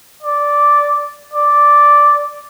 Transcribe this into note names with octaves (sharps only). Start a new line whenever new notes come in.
D5
D5